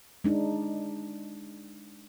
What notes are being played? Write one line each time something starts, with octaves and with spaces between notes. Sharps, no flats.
G#3 D4 D#4